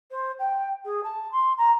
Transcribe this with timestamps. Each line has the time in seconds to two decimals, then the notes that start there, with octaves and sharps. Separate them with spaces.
0.11 C5
0.39 G5
0.85 G#4
1.04 A5
1.32 C6
1.58 A#5